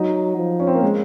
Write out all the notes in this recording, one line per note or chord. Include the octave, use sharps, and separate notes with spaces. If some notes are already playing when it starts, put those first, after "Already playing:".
Already playing: F#3 D#4
F3
C#4
C4
A#3
G#3